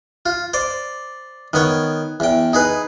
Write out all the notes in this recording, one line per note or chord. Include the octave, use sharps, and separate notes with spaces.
F4
C5 D5
D#3 B3 C#5
E2 G5
D#4 G#4 B4